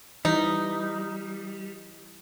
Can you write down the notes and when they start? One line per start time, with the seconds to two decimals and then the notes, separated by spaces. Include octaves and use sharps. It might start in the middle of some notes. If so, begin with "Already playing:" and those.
0.25 E3 G3 D#4 D#5